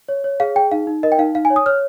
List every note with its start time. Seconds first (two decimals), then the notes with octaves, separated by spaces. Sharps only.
0.09 C#5
0.24 C#5
0.40 G#4 F5
0.55 G#4 G5
0.72 D#4 F5
0.87 D#4
1.03 A#4 D#5
1.12 G5
1.18 D#4 F5
1.34 D#4 F5
1.45 G#5
1.50 C#5
1.56 D#6
1.66 C#5 F6